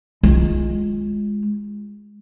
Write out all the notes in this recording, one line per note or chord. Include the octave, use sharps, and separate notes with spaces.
G#3 F4